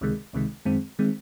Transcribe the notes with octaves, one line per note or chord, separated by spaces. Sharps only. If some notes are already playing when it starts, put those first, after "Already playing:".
C#2 C3 D#3 G#3
C#2 C3 D#3 G#3
F#2 D#3 G#3 C4
D#3 G#3 C4